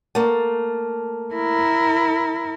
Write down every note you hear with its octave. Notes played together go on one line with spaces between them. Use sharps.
A3 A#3
E4 A#4